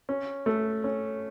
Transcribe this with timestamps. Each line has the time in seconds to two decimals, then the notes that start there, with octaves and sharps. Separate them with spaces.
0.09 C#4
0.46 A3
0.84 C#4